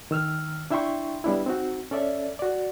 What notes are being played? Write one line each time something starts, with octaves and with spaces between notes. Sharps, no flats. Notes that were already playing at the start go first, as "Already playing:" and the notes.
D#3 E6 F6
D4 E4 E5 G5 C6 C#6
G3 B3 D4 E4
C4 D#4 F#4
C#4 A4 D5 E5
F#4 D5